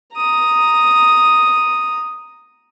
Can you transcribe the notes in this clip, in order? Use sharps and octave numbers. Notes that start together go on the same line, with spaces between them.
A#5 D#6